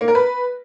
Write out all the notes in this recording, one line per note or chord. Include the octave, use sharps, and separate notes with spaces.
A#3
A#4
B4